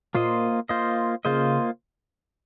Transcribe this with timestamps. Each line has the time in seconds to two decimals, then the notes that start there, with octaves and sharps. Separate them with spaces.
0.14 A#2 A#3 F4 C5 D#5
0.69 A#3 F4 C5 D#5
1.25 C#3 A#3 F4 C5 D#5